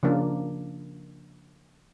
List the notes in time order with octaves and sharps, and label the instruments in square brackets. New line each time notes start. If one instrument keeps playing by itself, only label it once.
[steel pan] C#3 F3 A#3 D4